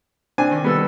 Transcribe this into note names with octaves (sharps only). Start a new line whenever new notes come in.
C4 D4 G#5
D#3
G3 B3 A4 E6